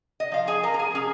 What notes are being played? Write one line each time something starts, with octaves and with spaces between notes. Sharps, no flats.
D#5
F3 F5
G#4 G#5
F3 A#4 A#5
A#5
G#4 G#5
C#4 G#4 G#5